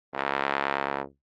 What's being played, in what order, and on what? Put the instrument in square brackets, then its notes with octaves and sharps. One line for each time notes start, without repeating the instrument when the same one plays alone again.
[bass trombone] C#2